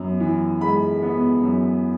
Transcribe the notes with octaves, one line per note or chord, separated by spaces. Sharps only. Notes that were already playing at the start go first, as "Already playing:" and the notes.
Already playing: F#2 B3
E3
G#3 B5
B3
F#2